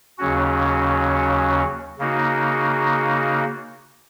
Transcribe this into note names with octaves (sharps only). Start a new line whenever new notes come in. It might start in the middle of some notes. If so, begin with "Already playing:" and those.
D#2 C#3 F#3 C#4 F#4
C#3 A#3 D#4 F#4